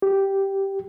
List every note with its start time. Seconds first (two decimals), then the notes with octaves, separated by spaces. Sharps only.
0.02 G4